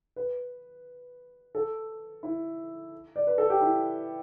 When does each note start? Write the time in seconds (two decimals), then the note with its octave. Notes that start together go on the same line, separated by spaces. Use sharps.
0.16 B4
1.55 A4
2.23 E4
3.16 D5
3.27 B4
3.38 A4
3.50 G4
3.61 E4